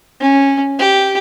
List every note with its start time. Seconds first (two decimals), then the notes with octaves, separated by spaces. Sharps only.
0.21 C#4
0.79 G4